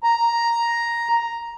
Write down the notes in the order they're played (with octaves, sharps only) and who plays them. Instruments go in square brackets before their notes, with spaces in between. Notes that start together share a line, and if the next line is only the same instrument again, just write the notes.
[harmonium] A#5